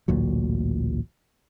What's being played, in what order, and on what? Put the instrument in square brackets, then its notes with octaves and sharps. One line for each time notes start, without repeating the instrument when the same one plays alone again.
[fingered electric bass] A1 D2 A#2 F#3